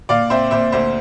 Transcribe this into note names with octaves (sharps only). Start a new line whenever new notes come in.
A#2 D5 F5
C4 C5 E5
A#2 C5 E5
D2 C5 E5